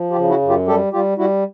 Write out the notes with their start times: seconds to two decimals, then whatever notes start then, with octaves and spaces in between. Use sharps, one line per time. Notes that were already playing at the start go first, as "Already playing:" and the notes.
Already playing: F3
0.10 F4 G4
0.17 C#3
0.29 E4 F#4
0.42 F#2
0.49 F4 G4
0.67 G3 G4 A4
0.92 G3 F4 G4
1.18 G3 E4 F#4